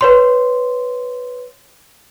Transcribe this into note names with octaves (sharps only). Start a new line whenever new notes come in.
B4 C#5 C6